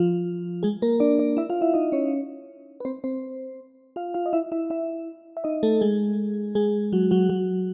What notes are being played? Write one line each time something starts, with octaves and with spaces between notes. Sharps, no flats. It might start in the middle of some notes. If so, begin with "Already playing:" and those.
Already playing: F3 F4
G#3 G#4
A#3 A#4
D4 D5
D4 D5
E4 E5
F4 F5
E4 E5
D#4 D#5
C#4 C#5
B4
C4 C5
C4 C5
F4 F5
F4 F5
D#5
E4 E5
E4 E5
E4 E5
E5
D#4 D#5
A3 A4
G#3 G#4
G#3 G#4
F#3 F#4
F#3 F#4
F#3 F#4